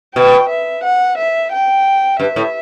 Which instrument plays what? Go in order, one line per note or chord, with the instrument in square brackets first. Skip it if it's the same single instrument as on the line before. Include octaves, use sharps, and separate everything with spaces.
[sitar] B2 [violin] G5
[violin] E5
F#5
E5
G5
[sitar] G2 [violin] E5
[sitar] A2